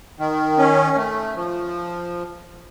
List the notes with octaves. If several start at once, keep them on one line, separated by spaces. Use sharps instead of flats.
D#3
C#4
A3
F3